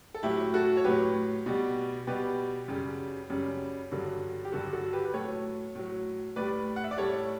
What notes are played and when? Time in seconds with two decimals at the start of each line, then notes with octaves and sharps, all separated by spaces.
0.15 A4
0.23 A2 F#3 E4 G4
0.54 F#4 A4
0.77 C#5
0.84 A2 F#3 G4 B4
1.46 B2 G3
2.07 B2 G3 G4 B4
2.68 F#2 C#3 G3
3.30 F#2 C#3 G3
3.91 G2 D3 F#3
4.45 G4
4.52 G2 D3 F#3 F#4 A4
4.73 F#4 A4
4.93 G4 B4
5.05 B4
5.14 A2 F#3 A4 C#5
5.75 A2 F#3
6.36 A2 G3 B4 D5
6.76 F#5
6.84 E5
6.91 D5
6.98 A2 G3 A4 C#5